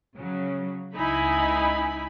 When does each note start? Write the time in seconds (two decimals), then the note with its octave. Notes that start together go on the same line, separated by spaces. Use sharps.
0.16 C#3 F#3
0.97 C#2 D#4 E4 G#5 B5